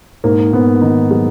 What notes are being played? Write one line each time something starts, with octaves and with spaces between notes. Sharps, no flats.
G#2 A#3
G#2 B3
D#3 D#4
F#3 G#4